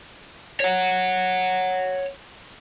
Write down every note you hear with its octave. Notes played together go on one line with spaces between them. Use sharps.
C#5 F#5